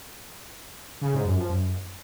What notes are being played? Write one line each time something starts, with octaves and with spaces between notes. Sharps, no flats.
C#3
G#2
F#2
F3
F#2